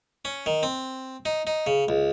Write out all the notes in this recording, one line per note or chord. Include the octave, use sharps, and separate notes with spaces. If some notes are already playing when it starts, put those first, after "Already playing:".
C#4
D#3
C4
D#4
D#4
C#3
C#2